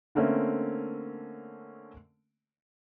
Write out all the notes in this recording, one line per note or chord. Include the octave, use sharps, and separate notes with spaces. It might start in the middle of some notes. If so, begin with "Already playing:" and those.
D3 A3 A#3 C4 C#4